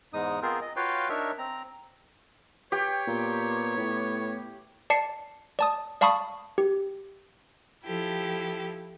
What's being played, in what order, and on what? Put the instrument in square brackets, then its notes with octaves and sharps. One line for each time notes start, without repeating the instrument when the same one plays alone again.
[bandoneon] E2 G#2 G#3 D#4 D#6
B3 C4 F4 G#4 A#4 C5
D#5
F4 F#4 B4 C#5 F5 G5
D4 D#4 A#4 C#5 E5
C4 A#5
[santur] G4 [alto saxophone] B4 [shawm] C#5
[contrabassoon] A#2 [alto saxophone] B3
[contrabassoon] A2
[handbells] D5 A5 C7 C#7
D5 A5 D#6
D5 F5 A5 B5 C#6 D#6
G4
[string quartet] F3 E4 G4 A4